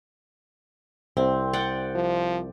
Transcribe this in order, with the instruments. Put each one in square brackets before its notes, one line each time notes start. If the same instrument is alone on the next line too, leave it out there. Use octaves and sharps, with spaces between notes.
[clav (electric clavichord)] C2 [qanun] C4
[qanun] D5 F#5 G5
[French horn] F3